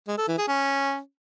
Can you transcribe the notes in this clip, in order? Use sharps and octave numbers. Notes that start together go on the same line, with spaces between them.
G#3
A4
E3
G#4
C#4